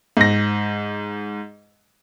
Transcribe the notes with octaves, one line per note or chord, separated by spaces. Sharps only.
G#2 A#6